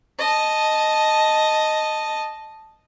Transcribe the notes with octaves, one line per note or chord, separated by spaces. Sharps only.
D#5 A5